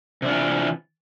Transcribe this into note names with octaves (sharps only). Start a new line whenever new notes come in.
C3 E3 D4 F4